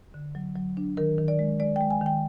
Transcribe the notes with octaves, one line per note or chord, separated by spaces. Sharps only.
D3
F#3
F#3
D4
D#3 A#4
D#3
D5
G#3
G#3 D5
G5
G#3
G#5
D#3 G5